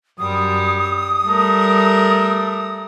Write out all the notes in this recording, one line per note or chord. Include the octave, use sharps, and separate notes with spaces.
F#2 G3 D#6
G3 A3 A#4